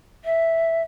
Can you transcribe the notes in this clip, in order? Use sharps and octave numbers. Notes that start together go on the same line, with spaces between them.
E5